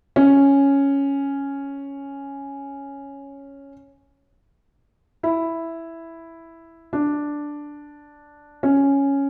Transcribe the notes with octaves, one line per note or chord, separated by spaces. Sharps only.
C#4
E4
D4
C#4